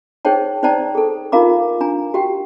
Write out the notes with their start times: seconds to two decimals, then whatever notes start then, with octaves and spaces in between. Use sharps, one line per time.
0.25 D#4 G#4 C5 C#5 G5 A5
0.63 D#4 C5 D5 G5 A5 A#5
0.95 G#4 A4
1.32 D#4 F4 A#4 F5 A#5 D6
1.81 D4 G#5 A#5
2.14 F#4 G4 G5